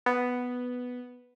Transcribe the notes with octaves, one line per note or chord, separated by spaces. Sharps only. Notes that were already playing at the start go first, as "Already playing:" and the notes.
B3